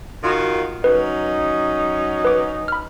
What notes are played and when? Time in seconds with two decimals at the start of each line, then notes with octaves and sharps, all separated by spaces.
0.23 D#3 F4 F#4
0.84 F#3 C#4 D#4 B4
2.25 B4 D6
2.68 B5 F6